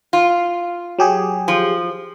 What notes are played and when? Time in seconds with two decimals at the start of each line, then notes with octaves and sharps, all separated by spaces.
0.13 F4
0.99 F#3 G4 G#4
1.48 F3